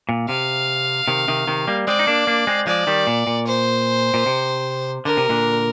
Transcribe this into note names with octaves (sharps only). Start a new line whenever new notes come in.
A#2
C3 F5
C3 D#3
C3 D#3
C3 D#3
G3 A#3
G#3 C4 D5
D#4
A#3 D4
A#3 D4
G#3 C4
F3 G#3 D5
D#3 G3
A#2
A#2
C5
A#2
C3
D3 A#4
C3
A#2 D3